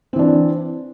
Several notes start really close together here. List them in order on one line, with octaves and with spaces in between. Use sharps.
C4 E3 D4